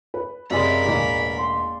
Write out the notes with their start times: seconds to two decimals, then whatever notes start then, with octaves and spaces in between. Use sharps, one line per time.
0.14 B4
0.51 F#2 C3 G#3 A#4 D5 F5 B5
0.85 E1 A1 A#3
1.38 C6